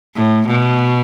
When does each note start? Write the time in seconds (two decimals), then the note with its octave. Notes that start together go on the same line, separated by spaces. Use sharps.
0.16 A2
0.47 B2